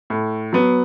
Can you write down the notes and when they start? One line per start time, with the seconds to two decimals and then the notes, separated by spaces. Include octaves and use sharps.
0.10 A2
0.53 F#3 B3